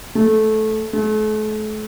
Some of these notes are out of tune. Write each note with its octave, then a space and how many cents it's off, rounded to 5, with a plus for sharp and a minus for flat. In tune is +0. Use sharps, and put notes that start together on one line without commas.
A3 -15
A3 -40